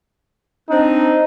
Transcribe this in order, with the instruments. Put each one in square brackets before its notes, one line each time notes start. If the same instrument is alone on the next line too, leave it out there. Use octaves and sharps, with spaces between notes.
[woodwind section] C4 D4 [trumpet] D#4